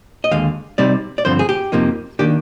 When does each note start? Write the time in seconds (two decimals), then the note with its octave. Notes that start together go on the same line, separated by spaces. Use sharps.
0.24 D#5
0.31 D#2 D3 G#3 F5
0.78 C3 G3 C4 D#4 D5
1.18 D5
1.25 G2 D3 F3 C4 C5
1.39 G#4
1.49 G4
1.72 F2 C3 F3 A#3 D#4
2.19 D#3 A#3 D4 G4